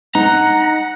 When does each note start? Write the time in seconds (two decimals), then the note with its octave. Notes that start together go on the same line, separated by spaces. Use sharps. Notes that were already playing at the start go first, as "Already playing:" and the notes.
0.15 D#4 F#5 A#5